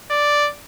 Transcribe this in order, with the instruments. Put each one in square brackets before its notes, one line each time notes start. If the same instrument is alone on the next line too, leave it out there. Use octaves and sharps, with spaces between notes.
[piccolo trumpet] D5